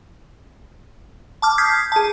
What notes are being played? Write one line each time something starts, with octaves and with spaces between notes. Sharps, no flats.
A5 D6 F6
D#6 G6 G#6 B6 C7
G#4 A5